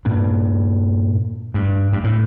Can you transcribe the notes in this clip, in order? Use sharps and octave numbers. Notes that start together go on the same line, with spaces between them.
G2 A#2
G2
G2
A2